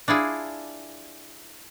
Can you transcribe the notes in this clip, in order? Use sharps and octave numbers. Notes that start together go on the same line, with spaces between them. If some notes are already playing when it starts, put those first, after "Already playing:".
D4 E4 F4 G#4